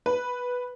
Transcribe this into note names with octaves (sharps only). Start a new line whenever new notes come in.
B4